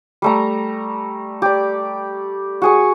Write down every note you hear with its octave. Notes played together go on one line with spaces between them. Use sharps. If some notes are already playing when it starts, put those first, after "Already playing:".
G3 A3 A#5
G4 D5
F#4 G#4 C#6